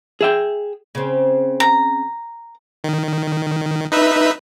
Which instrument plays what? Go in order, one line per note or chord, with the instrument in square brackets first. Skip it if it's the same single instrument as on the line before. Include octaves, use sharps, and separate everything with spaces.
[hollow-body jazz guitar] G#4 E5 G5
[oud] C#3 C4
[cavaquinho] A#5
[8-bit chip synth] D#3
D#4 B4 E5